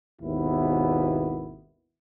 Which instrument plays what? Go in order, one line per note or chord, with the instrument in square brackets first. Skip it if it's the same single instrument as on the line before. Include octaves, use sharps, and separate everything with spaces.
[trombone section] G#1 D#2 B2 B3 E4